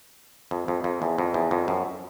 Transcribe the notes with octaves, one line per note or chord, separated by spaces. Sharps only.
F2
F2
F2
E2
F2
E2
F2
F#2